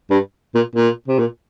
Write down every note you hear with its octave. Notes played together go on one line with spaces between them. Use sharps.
G2
A#2
A#2
C3
A#2